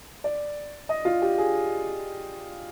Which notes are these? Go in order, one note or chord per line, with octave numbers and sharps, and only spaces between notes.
D5
D#5
F4
G4
G#4